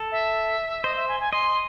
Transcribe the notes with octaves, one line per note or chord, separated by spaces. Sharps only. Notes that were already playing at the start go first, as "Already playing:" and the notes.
Already playing: A4
E5
C5 D#5
E5
G#5
G#5
D#5 C6